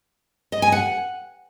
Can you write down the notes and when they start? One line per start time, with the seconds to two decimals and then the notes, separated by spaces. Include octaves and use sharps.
0.52 D#5
0.62 G#5
0.72 F#5